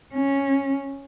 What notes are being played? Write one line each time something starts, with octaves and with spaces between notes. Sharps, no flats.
C#4